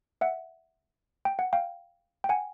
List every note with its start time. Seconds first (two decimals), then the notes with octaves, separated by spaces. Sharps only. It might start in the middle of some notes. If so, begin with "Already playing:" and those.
0.21 E5 F#5
1.25 G5
1.39 F#5
1.53 F5 G5
2.24 G5
2.29 F#5 G#5